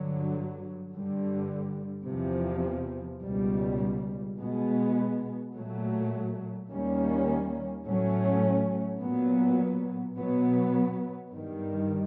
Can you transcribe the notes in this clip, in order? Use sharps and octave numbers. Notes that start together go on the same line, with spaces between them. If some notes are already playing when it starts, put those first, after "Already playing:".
Already playing: G2 D3 F#3
G2 D3 G3
E2 C3 F3
C#2 B2 G3
B2 G#3 B3
A#2 F#3 A3
D#2 D#3 G3 A#3 C#4
A2 F#3 A3 C#4
A#2 F#3 B3
B2 F#3 B3
G2 D#3 G3